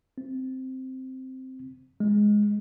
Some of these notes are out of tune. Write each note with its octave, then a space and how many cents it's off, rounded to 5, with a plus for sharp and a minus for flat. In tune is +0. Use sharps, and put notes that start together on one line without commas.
C4 -5
G#3 +0